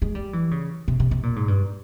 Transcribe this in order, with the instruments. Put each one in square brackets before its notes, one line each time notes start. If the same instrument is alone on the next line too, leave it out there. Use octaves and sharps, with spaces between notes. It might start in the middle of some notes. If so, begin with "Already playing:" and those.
[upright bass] G#3
G3
E3
C#3
C3
C3
C3
A#2
G#2
G2